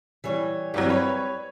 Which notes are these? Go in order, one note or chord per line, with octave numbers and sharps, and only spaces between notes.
E3 G3 C#5
G1 E3 F#3 G3 C4
B4 C#5